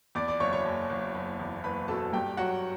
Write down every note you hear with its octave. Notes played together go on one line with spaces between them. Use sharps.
E2 D5 D6
D5 D6
F#1 C#5 C#6
C#5 C#6
F#1
F#1
F#1
E2
F#1 B4 B5
B2 A4 A5
G2 G4 G5
F#3 F#4 F#5